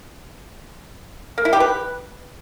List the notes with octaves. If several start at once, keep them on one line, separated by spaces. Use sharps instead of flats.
A#3
E4
G4
B4